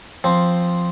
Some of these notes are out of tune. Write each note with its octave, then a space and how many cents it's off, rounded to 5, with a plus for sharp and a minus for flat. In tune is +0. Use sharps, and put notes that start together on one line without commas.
F3 +0 C4 +0